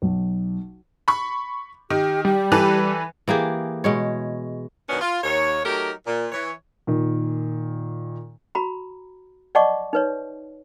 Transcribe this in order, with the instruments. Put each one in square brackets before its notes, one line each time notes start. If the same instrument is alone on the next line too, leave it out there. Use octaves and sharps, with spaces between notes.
[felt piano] B1
[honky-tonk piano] B5 C#6
[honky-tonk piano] D#3 [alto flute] G4
[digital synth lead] G3 [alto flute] G4
[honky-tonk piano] E3 A4 B4
[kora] E3 A#3 G4 G#4
B2 G#3 C#5
[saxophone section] F#2 B2 D#3 B3 C#4 D4
F4
D#2 C#5
F#3 A3 D#4 G4 A#4
A#2
E3 C#5
[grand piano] A#2 D#3
[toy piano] F#4 A#5 B5
D5 D#5 F#5 A5 C#6 D6
D#4 B4 C#5